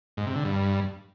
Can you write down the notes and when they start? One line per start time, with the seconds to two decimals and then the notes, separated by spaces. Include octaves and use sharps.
0.17 G#2
0.26 C3
0.36 D3
0.45 G2